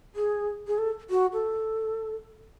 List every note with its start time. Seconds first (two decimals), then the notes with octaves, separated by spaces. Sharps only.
0.16 G#4
0.67 G#4
0.78 A4
1.10 F#4
1.33 A4